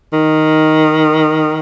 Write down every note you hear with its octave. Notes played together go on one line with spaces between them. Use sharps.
D#3